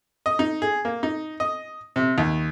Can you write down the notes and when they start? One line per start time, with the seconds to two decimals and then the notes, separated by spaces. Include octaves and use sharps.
0.26 D#5
0.39 D#4
0.62 G#4
0.85 A#3
1.03 D#4
1.40 D#5
1.96 C3
2.18 D#2